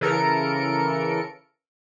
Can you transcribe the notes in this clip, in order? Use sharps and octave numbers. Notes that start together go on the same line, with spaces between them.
C#3 E3 A4 A#4 C#7 D7